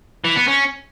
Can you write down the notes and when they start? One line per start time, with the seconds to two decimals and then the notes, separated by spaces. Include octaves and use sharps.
0.24 E3
0.36 B3
0.48 C#4